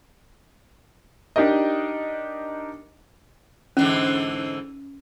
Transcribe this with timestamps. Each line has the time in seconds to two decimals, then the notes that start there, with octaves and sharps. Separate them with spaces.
1.36 D4 D#4 G4 A#4 D#5
3.77 G#2 D3 E3 C#4